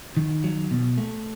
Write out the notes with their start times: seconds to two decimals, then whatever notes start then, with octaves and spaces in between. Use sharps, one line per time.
0.17 D#3
0.44 F#3
0.71 B2
0.98 A3